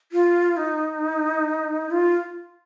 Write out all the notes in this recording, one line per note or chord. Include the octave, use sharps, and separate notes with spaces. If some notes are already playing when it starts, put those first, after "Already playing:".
F4
D#4
F4